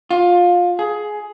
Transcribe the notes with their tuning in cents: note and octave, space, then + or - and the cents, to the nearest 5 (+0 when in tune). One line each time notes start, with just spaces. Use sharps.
F4 +20
G#4 +15